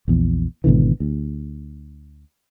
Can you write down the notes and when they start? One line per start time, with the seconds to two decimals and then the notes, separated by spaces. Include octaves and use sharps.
0.08 A#1 E2
0.64 G#1 B2 D3 E3
1.00 D2